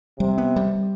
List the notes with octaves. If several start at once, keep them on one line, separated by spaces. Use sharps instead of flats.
C3 G3
B3
G3